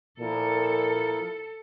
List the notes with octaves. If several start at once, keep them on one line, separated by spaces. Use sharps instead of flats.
A#2 F3 E4 A4 A#4